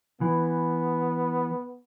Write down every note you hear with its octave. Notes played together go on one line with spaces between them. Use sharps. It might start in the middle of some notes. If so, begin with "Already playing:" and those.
E3 B3